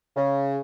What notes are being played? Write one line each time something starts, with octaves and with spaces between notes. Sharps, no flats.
C#3